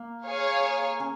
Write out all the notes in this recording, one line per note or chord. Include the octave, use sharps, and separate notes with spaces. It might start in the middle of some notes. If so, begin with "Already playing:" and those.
Already playing: A#3
G#4 C#5 F5 G#5
C#4